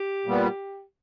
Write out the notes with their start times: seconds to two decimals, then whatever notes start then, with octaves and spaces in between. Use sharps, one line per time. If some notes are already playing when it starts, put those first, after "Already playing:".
Already playing: G4
0.26 A#2 G3 B3